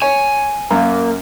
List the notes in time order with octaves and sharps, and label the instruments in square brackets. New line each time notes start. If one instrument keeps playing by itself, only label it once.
[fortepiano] C#5 [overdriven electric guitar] G#5
[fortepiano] F#2 [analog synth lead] A#3